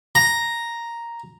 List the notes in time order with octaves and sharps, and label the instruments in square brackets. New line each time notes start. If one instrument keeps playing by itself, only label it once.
[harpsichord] A#5